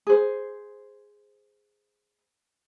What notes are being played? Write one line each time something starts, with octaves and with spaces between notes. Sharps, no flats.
G#4 C5